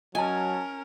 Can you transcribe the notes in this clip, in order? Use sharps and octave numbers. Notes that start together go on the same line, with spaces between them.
F#3 C#4 A#4 D#5 G#5 A5